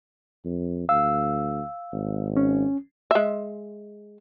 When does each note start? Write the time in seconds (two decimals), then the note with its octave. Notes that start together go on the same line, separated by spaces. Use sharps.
0.45 F2
0.89 D2 F5 E6
1.93 G#1
2.37 C#4
3.11 G#3 E5